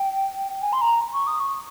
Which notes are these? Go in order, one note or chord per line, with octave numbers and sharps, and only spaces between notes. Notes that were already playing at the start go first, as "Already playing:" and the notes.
Already playing: G5
G#5
C6
A#5
C#6
D#6
C#6